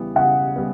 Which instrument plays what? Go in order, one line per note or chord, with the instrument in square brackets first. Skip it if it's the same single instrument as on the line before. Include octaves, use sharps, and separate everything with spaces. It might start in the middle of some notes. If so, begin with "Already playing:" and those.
Already playing: [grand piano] C#3 E3 G3 B3
[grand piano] C#3 [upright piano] F#5
[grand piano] G3 B3